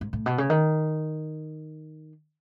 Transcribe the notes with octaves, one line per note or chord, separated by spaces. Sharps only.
G#2
A2
B2
C#3
D#3